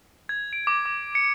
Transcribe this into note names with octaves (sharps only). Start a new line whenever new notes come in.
G#6
D7
D6
D6
C#7